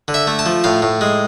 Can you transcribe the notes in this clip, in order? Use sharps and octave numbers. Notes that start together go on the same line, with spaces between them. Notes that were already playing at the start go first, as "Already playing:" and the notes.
D3
E5
A3
A5
F3
A2 F5
A2
G#3